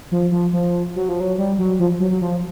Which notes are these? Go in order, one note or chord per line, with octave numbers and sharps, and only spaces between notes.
F3
F3
F3
F#3
F3
F#3
G3
F#3
F3
F#3
F#3
F3